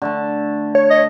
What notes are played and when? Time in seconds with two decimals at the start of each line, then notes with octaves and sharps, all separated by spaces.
0.02 D3 A3 A5
0.75 C#5
0.90 D#5